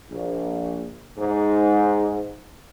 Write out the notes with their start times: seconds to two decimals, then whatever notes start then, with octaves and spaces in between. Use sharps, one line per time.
0.10 A#1
1.18 G#2